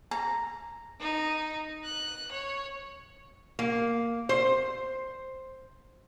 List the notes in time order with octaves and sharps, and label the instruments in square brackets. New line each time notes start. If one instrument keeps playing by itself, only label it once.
[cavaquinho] A#5
[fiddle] D#4
F#6
C#5
[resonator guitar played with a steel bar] A#3
C5